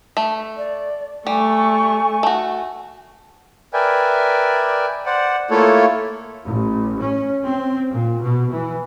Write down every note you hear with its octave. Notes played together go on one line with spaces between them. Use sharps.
A3
D5
G3 A3 G#5 C#6
A3 F#4
A#4 B4 D5 E5 G5 G#5
C5 D5 F#5
A3 A#3 E4 F4 A4 C#5
A1
C#4
C4
A#2
B2
E3